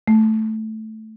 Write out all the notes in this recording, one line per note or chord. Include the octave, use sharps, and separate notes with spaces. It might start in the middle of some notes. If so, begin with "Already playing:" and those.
A3